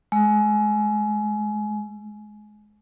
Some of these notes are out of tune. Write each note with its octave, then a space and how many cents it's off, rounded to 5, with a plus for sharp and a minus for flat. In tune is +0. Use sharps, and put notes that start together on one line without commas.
G#3 +25